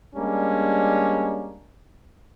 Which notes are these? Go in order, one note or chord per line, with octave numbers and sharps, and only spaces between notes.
G3 G#3 A#3 C#4 D4